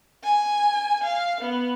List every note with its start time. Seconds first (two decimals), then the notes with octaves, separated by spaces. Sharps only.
0.24 G#5
1.04 F5
1.41 B3